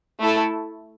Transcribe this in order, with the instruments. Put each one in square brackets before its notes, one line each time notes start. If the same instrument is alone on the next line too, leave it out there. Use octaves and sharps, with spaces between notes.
[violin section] A3 E4 A4